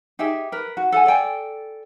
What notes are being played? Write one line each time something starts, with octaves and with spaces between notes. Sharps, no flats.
D#4 G4 G#4 E5
A#4 B4
F#4
A4 F#5 G#5
A4 D5 G5 G#5